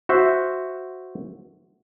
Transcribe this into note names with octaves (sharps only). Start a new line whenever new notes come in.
F#4 C5 E5